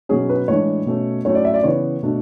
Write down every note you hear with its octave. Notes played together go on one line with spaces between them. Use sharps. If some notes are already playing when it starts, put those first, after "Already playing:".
B2 F#3 C#4 G#4
B4
A2 E3 G#3 D4 C#5
B2 A3 C#4
A2 F#3 A3 C#4 C#5
D5
E5
D5
C#3 E3 B3 C#5
B2 A3 D4